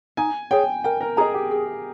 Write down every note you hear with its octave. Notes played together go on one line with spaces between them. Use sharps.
D#4 G#5
G#4 C#5 G5
A#4 G5
A#4
G#4 D#5 A#5
G4
G#4